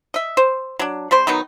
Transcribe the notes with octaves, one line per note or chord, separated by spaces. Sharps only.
D#5 E5
C5
F#3 D4
G3 C4 C5 C6
D#3 F#3 B3 D#4